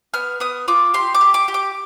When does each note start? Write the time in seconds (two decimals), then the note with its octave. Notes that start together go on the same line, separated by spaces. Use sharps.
0.14 B3 F6
0.40 B3 D#6
0.68 F4 D6
0.94 G4 C6
1.14 D6
1.21 G4
1.34 D6
1.48 G4
1.54 D6